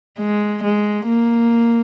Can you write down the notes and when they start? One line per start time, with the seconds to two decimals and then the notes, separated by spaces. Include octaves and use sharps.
0.18 G#3
0.63 G#3
1.07 A#3